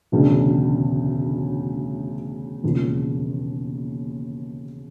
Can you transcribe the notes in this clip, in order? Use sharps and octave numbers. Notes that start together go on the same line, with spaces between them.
E1 D2 C#3
E1 D#2 C#3 F3 G#3